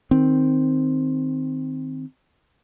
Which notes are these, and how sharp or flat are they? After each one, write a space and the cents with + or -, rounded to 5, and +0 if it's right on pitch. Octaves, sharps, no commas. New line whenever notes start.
D#3 +0 C4 +0